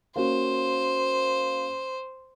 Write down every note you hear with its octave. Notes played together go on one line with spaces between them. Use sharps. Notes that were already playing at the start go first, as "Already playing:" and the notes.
A#3 C#4 F#4 C5